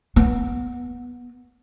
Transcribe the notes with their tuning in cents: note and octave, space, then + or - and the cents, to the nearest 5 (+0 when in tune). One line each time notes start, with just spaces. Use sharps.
B3 -15